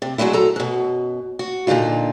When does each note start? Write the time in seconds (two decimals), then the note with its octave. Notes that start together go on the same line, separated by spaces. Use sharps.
0.02 C3
0.18 F#3 G#3 A3 D4 E4
0.33 A4 A#5
0.56 F#2 B2
1.39 F#4
1.67 A#2 D3 D4 D#4 F4